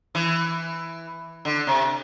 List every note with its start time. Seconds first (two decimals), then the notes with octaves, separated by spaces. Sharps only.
0.15 E3
1.45 D3
1.67 C3